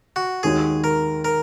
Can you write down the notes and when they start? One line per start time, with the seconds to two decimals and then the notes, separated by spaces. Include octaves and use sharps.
0.16 F#4
0.43 D#2 D#3 G#3 F#4 G#4 C#5
0.84 A#4
1.25 A#4